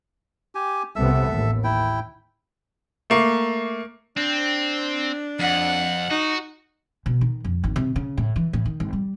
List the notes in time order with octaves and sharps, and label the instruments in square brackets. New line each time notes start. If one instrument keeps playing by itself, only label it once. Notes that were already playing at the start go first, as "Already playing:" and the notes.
[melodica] G4 G#5
[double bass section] C2 C3 B3 [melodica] A4 E5 E6
[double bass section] A1 D#2
[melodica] E4 G5
[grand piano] A3 A#3
[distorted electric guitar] C4 [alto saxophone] D4
[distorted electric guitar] F2 [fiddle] F#5
[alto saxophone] D#4 [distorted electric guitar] F#4
[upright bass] B2
D#3
F2
G#1
C3
C#3
A2
E3
A2
D#3
G#1
G3